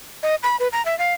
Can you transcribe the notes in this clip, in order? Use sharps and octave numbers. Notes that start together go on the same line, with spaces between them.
D#5
B5
B4
A#5
E5
F5